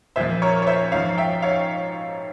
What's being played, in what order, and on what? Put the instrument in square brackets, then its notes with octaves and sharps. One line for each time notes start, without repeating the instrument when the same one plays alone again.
[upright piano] A#2 F3 C5 E5
A#4 C#5
C#5
C5 E5
G#2 F3 C#5 F5
E5 G5
C#5 F5